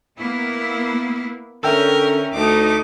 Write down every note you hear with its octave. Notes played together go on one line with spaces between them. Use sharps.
A#3 B3 E4
D3 C#4 A#4 E5 G5 E6
D2 A3 D#4 D6